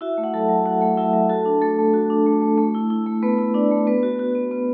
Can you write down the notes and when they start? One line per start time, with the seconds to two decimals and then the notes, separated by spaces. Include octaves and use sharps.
0.01 E4 F#4 E5
0.18 A3
0.24 F#5
0.34 F#3 A4 A5
0.49 F#3
0.66 F#4 F#5
0.81 A3
0.97 F#3 E4 E5
1.13 F#3
1.29 F#4 A4 A5
1.45 D4
1.61 A3 A4
1.79 A3
1.94 F#4
2.10 D4
2.26 A3
2.42 A3
2.58 A3
2.74 E4
2.90 E4
3.06 A3
3.23 A3 B3 B4
3.38 E4
3.54 D4 E4 D5
3.71 A3
3.87 B3 B4
4.03 F#4
4.19 F#4
4.35 B3
4.51 B3